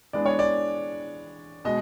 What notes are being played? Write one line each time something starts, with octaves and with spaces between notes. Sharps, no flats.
E3 G#3 B3 D4 D5
C#5
D5
B2 G#3 D#5